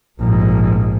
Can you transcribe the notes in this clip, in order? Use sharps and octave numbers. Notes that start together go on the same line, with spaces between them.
A#1 G#2